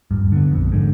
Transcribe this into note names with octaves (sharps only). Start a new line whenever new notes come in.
D#1 G2
D3 B3
A#1 F2
G#2 D3